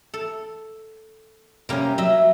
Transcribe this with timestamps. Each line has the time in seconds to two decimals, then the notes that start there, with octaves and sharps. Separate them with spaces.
0.14 A4
1.69 C3 G3 A#3 C#4
1.98 F#3 D#5 E5